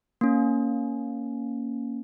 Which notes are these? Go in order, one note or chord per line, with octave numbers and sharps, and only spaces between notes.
A#3 C#4